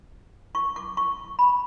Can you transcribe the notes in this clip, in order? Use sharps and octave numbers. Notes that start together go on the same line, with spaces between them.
C#6
D6
C#6
B5